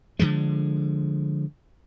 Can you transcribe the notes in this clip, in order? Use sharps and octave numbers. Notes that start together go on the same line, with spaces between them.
D3 E3 F3 G#3